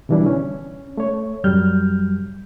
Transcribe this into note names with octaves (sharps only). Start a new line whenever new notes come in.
B2 D3 E3 G3 D4 E4
C#4
A3 C#5
F#2 F#3 G3 F6 G6